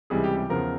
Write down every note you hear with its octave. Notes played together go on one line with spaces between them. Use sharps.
C#2 C3 E3 G3 G#4
G4
G4
E2 C#3 F3 A#4